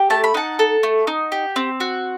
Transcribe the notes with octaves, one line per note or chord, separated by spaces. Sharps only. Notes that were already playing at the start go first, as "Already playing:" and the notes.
Already playing: G4
A3 A5
B5
D#4 F#5 A5
A4
A3
D#4
G4
C4
F#4